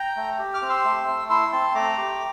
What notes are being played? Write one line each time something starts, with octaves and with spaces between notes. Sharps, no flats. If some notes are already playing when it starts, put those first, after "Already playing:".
Already playing: G5 A#5
A3
G4
D6 F6
C4
C6 E6
A3
A3
E4 C6 E6
C4 A5 C6
A3 A#5 D6
G4